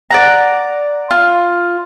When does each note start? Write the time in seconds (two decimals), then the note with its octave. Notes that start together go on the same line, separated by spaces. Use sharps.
0.11 D5 F#5 A#5
1.11 F4